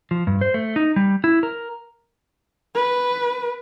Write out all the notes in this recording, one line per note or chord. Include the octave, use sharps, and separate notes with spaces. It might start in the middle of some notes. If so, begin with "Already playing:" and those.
F3
G2
C5
A3
D#4
G3
E4
A#4
B4